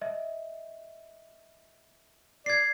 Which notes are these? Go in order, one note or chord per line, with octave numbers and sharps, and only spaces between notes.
D#5 E5
D5 G#6 C7